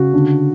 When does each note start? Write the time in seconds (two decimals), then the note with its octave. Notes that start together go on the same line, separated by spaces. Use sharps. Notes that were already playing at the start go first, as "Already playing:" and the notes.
Already playing: C#3 F#4
0.13 D3